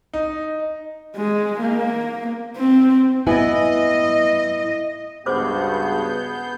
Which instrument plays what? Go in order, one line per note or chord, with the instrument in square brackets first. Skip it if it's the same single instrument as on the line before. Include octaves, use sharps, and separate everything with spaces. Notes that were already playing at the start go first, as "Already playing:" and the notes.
[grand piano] D#4
[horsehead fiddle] G#3
A#3
C4
[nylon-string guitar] B3 E4 G#5 [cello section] D#5
[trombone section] C#2 G2 F#4 [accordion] B3 G6 [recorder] G#4 [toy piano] C5 D6